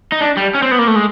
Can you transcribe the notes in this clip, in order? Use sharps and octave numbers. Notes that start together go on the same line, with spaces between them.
D#4
D4
G3
C#4
C4
B3
A#3
A3
G#3